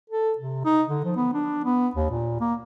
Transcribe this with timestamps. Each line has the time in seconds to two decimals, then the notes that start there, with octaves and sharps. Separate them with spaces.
0.10 A4
0.38 C3
0.65 D#4
0.89 D3
1.04 F3
1.16 B3
1.33 D4
1.65 B3
1.95 D#2
2.10 A#2
2.40 A#3